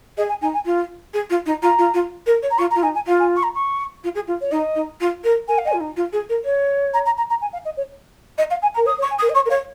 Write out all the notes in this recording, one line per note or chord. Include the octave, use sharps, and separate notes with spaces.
G#4 D#5
G#5
D#4 G#5
G#5
F4
G#4
F4
D#4
F4 A#5
F4
F4
A#4
C#5
A#5
F4 C#6
A#5
F4
D#4 G#5
G#5
F4 F5
G#5
C#6
A#5
C#6
F4
G#4
F4
C#5
D#4 D#5
D#4
F4
A#4
A#4 G#5
F5
D#5
G#5
F4
D#4
F4
G#4
A#4
C#5
A#5
A#5
A#5
A#5
G#5
F5
D#5
C#5
D#5
F5
G#5
A#5
A#4
C#5 D#6
C#5
C#6
G#5
D#6
A#4
D#5
C#5 C#6
A#4
C#5 F5